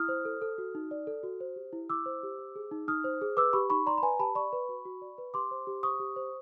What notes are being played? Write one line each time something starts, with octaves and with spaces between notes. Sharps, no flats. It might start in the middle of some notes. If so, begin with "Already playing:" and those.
Already playing: E4 D#6 F6
C5
A4
A4
F#4
D#4
D5
A4
F#4
C5
G4
E4
E4 D6 E6
C5
G4
C5
G#4
D#4
D#4 D#6 F6
C5
G#4
B4 D6 E6
G4 B5 C#6
D#4 B5 C#6
D5 A#5 C6
B5
B4 G#5 A#5
G4 A5 B5
D5 B5 C#6
B4
F#4
F#4
D5
B4
G4 C6 D6
C5
G4
C5 C#6 D#6
G4
C5